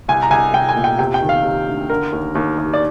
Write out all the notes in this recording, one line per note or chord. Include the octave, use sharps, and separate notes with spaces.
C2 G#5
A#5
C2 G#5
C2 G5
G#5
A#2
G5
C3 G5
G5
D#3
F5
C3
D2
D3 A#4
D#2
D#2
D#2
D5